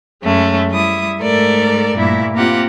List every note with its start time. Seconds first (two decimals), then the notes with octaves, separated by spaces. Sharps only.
0.23 F#2 G#3 A3 C#4
0.71 G3 E4 D#6
1.22 G#2 A3 A4 A#4 D5
1.95 G2 A#2 A3 E4
2.35 A#3 C4 F4 G4 F#5